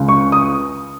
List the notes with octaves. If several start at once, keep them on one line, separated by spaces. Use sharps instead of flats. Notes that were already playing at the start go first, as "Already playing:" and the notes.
Already playing: C#2 C#3
C#6
D#6